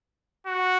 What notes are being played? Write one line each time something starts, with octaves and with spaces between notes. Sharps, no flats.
F#4